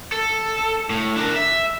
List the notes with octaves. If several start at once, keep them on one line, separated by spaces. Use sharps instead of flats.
A4
A2
D4 A#4
E5